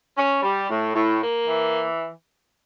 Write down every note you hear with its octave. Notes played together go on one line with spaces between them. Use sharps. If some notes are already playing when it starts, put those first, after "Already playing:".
C#4
G3
A2
A2
A#3
E3